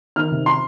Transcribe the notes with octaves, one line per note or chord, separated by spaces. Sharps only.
D#3 F6
C3
C6